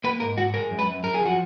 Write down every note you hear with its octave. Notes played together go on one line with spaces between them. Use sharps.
A#3 B4
G#2 A#4
G#2 F#4
G#3 A#4
F#2
B4
F#2
F#2 A#4
G#4
F3 F#4